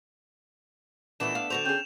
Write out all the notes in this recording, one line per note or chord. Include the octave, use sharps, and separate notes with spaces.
D#2 A#2 E3 A3 B3 D4 E7
F5
D3 F#4 C5 F7
C#4 G#4 G5